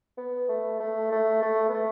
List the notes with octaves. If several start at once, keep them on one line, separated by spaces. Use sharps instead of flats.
B3
A3
A3
A3
A3
B3
A3